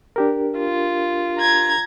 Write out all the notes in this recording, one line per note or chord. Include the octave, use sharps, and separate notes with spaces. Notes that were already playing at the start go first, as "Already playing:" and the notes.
D4 G4 A#4
F4
A#5 G#6